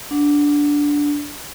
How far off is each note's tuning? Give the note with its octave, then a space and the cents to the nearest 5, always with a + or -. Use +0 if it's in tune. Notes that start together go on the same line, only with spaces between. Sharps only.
D4 -10 F#5 -10